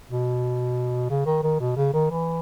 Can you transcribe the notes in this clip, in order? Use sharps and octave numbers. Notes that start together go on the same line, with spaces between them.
B2
C#3
D#3
D#3
B2
C#3
D#3
E3